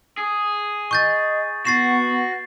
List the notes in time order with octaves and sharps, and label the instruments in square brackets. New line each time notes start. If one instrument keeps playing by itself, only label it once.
[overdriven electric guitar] G#4
[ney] D#5 [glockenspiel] C#6 G6 A6
[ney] B3 [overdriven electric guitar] F#4 [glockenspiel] A6 C7 E7